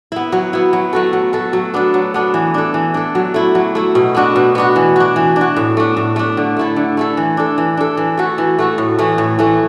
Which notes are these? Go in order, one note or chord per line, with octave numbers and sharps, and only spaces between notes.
B3 E4
F#3
B3 E4
F#3
A3 F#4 A4
F#3
A3 F#4 A4
F#3
B3 D4 A4
F#3
B3 D4 A4
E3
D4 A4
E3
D4 A4
F#3
A3 E4
F#3
A3 E4
B2
B3 D4 F#4
B2
B3 D4 F#4
E3
D4 F#4
E3
D4
F#4
A2
A3 D4
A2
A3 D4
D3
A3 E4 A4
D3
A3 E4 A4
E3
D4 A4
E3
D4 A4
E3
A3 F#4 A4
E3
A3 F#4 A4
A2
E3 A3
A2
E3 A3